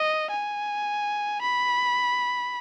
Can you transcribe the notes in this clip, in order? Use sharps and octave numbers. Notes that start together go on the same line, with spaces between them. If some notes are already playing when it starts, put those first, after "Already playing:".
Already playing: D#5
G#5
B5